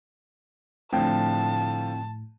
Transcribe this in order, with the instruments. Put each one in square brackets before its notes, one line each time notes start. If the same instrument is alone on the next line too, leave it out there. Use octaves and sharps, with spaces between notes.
[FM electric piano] A2 [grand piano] D3 F3 [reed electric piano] C4 E4 G5 [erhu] A5